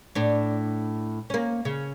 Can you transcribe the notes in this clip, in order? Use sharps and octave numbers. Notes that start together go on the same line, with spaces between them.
A2 D4
A#3 C#4
C#3